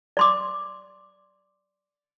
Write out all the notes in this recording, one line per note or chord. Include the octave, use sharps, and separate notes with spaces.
D5 C6 D6